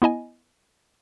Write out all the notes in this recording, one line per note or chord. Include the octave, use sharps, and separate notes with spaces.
B3 E4 D#5 G#5